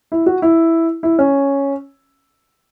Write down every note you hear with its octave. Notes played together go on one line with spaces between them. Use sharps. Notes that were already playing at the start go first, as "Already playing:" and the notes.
E4
F#4
E4
E4
C#4